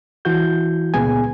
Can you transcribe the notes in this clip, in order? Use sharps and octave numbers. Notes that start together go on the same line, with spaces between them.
E3 E4 F#4 G6
C#2 A#2 B3 G#4 G#5